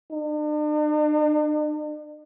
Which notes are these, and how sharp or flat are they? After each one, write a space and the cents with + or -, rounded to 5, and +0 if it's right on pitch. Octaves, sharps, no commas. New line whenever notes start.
D4 +45